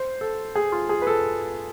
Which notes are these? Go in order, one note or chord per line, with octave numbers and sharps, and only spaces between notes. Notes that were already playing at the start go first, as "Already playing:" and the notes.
Already playing: C5
A4
G#4
F4
G#4
B4
A4